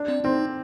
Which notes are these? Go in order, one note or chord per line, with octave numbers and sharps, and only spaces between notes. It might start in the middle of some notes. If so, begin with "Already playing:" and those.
Already playing: D4
C4
C4 D#4